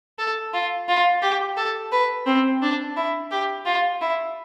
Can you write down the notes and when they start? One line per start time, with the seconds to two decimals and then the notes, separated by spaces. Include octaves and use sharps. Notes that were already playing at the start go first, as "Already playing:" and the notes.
0.19 A4
0.53 F4
0.88 F4
1.22 G4
1.57 A4
1.92 B4
2.26 C4
2.62 D4
2.96 E4
3.31 G4
3.65 F4
4.01 E4